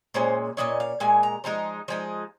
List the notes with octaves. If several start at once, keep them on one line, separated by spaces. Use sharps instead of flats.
A#2 G#3 C#4 C5
A#2 G#3 C#4 D#5
F5
A#2 G#3 G#5
A#5
F3 G#3 D#4 A#5
F3 G#3 D#4